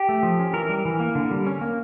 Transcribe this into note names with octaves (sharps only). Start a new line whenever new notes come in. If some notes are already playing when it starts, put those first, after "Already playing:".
Already playing: G4
A3
F3
C#4
E3 A#4
G3
E3
A#3
D3
G3
C#4
A#3